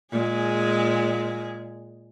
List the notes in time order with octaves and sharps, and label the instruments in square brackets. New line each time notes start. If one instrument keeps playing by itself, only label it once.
[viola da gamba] A#2 G#3 G#4